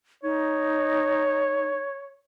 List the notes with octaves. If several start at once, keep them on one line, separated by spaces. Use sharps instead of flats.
D#4 C#5